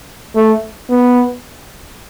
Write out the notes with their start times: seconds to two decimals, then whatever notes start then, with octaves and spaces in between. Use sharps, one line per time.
0.36 A3
0.90 B3